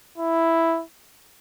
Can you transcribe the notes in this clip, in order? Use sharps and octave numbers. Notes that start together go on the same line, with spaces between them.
E4